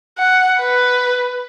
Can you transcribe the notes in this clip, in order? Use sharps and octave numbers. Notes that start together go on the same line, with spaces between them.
F#5
B4